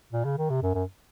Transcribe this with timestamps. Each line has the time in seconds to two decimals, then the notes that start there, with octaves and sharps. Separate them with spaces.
0.13 A#2
0.25 C#3
0.38 D#3
0.50 C3
0.63 F#2
0.75 F#2